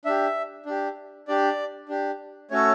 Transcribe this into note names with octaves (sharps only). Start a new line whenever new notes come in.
D4 G4 E5
D4 G4
D4 G4 D5
D4 G4
A3 C#4 F#4 A4 C#5